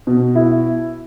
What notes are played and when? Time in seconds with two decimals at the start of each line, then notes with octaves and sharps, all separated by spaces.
0.07 B2
0.35 E4